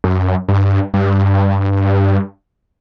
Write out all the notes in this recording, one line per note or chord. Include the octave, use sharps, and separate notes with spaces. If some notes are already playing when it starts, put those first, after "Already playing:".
F#2
G2
G2